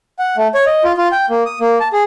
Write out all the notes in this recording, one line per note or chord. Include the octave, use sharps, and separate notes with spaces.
F#5
A3
C#5
D#5
F4
F4
G5
A#3
D#6
A#3
A5
G#4